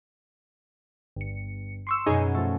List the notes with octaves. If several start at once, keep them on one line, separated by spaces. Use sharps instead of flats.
G1 C#7
C6 C#6 E6
F#2 B2 D#4 G#4 C#5
F3 A3